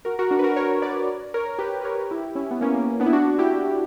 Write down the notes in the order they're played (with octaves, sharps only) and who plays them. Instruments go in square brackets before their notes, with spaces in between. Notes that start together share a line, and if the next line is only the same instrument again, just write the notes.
[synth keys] F#4 A#4
F#4 A#4
D4 F#4
B4
F#4 A#4
A#4 C#5
B4 D5
A#4 C#5
G4 B4
B4
A#4 C#5
E4 G4
C#4 E4
B3
A#3 C#4
A#3 C#4
B3 D4
E4
D4 F#4
E4 G4